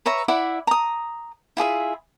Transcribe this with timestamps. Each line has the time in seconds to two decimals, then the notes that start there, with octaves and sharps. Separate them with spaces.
0.06 B4 C#5 E5 A#5
0.28 E4 D5 E5 F#5
0.67 A#5 D#6
1.57 E4 F4 G#4 E5